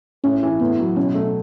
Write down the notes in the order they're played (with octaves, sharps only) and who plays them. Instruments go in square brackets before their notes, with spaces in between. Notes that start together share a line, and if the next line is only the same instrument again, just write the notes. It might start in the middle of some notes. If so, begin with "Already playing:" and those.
[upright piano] A2 [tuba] C#4
[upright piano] E3
[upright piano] A2 [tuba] B3
[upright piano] F#3
[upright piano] B2 [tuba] C#4
[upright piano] A3